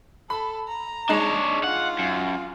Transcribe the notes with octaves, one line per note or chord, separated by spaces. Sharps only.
A4 B5
A#5
G#3 D4 D#4 C#5
F4 F#5
F#2